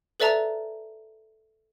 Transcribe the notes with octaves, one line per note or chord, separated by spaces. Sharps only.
A4 B4 D5 E5 A5 A#5